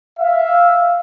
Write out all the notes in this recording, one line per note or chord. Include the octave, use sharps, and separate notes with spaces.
E5 F5